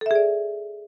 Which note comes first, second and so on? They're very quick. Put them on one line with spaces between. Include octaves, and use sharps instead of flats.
A4 E5 G#4 D5